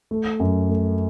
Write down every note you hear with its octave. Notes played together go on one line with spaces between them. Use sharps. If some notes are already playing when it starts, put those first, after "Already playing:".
A3
F#2
A3